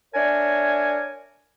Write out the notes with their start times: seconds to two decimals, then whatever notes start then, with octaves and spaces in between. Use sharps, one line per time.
0.14 D4 A#4 C#5 E5 G#5